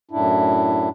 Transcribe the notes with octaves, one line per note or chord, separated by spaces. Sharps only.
F#2 A2 D4 E4